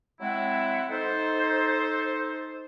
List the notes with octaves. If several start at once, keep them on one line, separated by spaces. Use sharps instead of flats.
F#3 G#3 C4 E4 E5 F#5
D#4 A4 C5